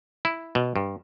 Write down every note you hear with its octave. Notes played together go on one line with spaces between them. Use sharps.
E4
B2
G2